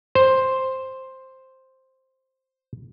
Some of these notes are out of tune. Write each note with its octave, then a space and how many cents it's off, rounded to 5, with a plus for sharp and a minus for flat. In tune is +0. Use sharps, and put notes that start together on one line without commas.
C5 +5